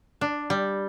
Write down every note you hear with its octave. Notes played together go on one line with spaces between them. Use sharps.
D4
G3